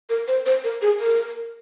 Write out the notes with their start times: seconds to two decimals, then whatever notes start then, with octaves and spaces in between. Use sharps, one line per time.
0.10 A#4
0.28 C5
0.46 C5
0.64 A#4
0.82 G#4
1.00 A#4